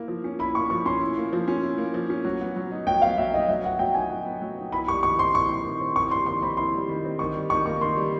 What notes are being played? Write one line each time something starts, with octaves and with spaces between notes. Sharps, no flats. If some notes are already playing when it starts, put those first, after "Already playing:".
Already playing: A#3 E4
F3
C#4
E4 B5
A#3 C#6
F3 C#6
C#4 C6
E4
A#3
F3
C#4
E4
A#3
F3
C#4
F#3
B3
F#3
D#4
F#3 G5
B3 F5
F#3 E5
D#4 D#5
F#3 E5
B3 F#5
F#3 G5
D#4 G#5
F#3
B3
F#3
D#4
E4 B5
G3 C#6
D#3 C#6
C4 C6
E4 C#6
G3
D#3
C4
E4 C#6
G3 C6
D#3 C6
C4 B5
E4 C6
G3
D#3
C4
D#3 C#6
G3
D#3 C#6
A#3 C#6
D#3 C6
G3